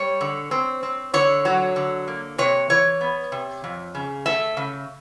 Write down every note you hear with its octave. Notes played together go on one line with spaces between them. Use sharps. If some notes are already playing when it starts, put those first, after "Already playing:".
Already playing: G3 C#5
D3
C4
C4
D3 C#5
F#3
D3
A#3
C3 C#5
E3 C#5
B3
C3
F2
C#3
A3 E5
C#3